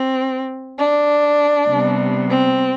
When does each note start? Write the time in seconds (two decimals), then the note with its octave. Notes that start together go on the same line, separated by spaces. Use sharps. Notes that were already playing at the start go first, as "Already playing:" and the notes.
Already playing: C4
0.77 D4
1.68 C3 G3 B3
2.30 C4